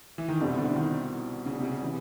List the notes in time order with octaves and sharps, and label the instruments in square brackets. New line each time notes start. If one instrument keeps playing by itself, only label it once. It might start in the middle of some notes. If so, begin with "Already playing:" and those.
[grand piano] E3
D#3
[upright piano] C2 B2 G3 C4 E4 [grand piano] D3
[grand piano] D3
D3
D#3
C#3
C3
C#3
[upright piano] C3 E3